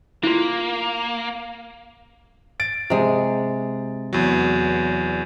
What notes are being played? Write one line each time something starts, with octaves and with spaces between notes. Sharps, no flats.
A#3 E4 F4
A6 D7
C3 G#3
E2 F#3